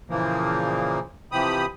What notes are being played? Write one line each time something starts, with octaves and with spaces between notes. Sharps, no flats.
A#2 C#3 E3 F3 A#3
C3 E3 F3 G4 B5 D#6